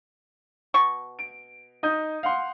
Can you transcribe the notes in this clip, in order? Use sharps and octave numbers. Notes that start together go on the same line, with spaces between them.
B2 C#6
D7
D#4 D#6 G6
F5 F#5 C6